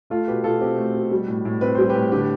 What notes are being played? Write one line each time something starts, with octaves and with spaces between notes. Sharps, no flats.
A3 F4 A4
B2 G4 B4
B2 F4 A4
C4 G4
A3
B2
G3
A2
A2
C4 B4
G3 C5
G4 B4
A2
D3 G4 B4